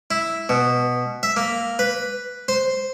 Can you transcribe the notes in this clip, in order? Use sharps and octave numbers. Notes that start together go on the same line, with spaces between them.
E4
B2
E5
A#3
B4
C5